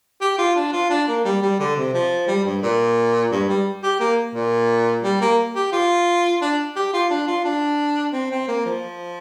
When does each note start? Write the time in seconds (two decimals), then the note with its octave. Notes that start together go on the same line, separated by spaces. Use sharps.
0.21 G4
0.38 F4
0.56 D4
0.72 F4
0.90 D4
1.08 A#3
1.24 G3
1.42 G3
1.59 D3
1.76 C3
1.94 F3
2.27 G3
2.45 G2
2.62 A#2
3.31 G2
3.49 G3
3.83 G4
4.00 A#3
4.34 A#2
5.03 G3
5.21 A#3
5.55 G4
5.72 F4
6.42 D4
6.76 G4
6.93 F4
7.10 D4
7.27 F4
7.45 D4
8.13 C4
8.31 C4
8.48 A#3
8.65 F3